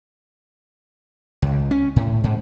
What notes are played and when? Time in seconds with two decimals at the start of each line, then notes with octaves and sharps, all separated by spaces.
1.42 C#2
1.71 C#4
1.96 A2
2.24 G#2